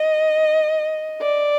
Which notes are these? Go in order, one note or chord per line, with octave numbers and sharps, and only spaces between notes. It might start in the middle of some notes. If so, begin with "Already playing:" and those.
Already playing: D#5
D5